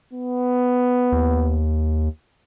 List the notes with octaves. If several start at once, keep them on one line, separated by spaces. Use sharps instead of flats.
B3
D#2